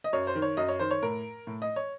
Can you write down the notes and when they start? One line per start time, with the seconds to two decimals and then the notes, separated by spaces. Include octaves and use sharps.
0.04 D#5
0.13 F#2 C#5
0.27 C5
0.35 D#3
0.42 C#5
0.57 F#2 D#5
0.68 C#5
0.80 D#3 C5
0.91 C#5
1.02 A2 A#4
1.47 A2
1.62 D#5
1.76 C#5